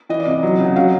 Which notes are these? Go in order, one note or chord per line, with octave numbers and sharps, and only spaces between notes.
E3 D#5
D5
C3 D#5
F#3
C#3
F#5
F#3 F5